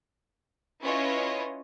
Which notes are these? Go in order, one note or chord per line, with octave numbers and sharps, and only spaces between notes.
C#4 E4 F4 B4 C#5 D#5